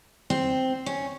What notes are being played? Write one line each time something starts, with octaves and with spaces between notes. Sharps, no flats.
C4
C#4